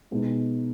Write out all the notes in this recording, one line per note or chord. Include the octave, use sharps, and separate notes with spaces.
B2 G#3 B3 D#4